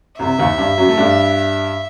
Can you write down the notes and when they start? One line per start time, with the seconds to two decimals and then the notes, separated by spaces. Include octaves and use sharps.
0.19 C2 C3 E5
0.38 D#2 D#3
0.58 G2 G3
0.78 F#2 F#3
0.89 A3
0.97 G2 G3